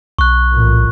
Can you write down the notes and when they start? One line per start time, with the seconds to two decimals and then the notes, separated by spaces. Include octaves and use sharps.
0.18 B1 C#6 F#6
0.52 A1 A#2